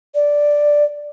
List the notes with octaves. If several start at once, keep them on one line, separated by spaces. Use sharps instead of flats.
D5